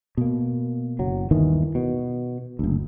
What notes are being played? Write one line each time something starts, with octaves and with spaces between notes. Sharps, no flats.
B2 A#3
F#1 F#3
G1 D#2 D#3 E3
B2
F#1 D2